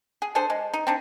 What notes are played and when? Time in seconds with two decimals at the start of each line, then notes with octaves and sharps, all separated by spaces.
0.22 G#4
0.35 D4 G#4 A4 C5
0.50 G#3
0.74 D#4
0.87 C4 D4 D#4